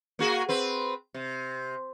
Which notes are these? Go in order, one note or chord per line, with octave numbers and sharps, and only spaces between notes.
A#3 F#4 G#4
C4 B4
C3